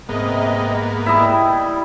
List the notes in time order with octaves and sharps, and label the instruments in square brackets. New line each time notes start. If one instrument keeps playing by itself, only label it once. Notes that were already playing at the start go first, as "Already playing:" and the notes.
[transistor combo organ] G#2 A#3 B3 [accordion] C3 D#5
[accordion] G3 [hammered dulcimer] E4 D#5